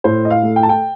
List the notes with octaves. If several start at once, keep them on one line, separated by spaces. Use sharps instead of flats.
A2 C5
D#5
F5
A3
G5
A5
G5